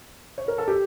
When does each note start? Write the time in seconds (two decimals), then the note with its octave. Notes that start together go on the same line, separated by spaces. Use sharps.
0.38 C#5
0.48 A#4
0.58 A4
0.68 G4